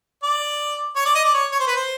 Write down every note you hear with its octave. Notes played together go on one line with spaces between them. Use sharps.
D5
C#5
D5
D#5
D5
C#5
C#5
C5
B4
C5